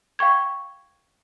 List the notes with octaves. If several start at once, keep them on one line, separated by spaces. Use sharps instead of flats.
F5 G5 C#6 G#6